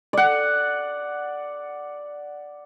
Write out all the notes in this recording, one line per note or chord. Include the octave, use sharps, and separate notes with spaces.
D5 F#5